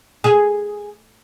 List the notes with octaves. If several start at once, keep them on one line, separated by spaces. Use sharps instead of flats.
G#4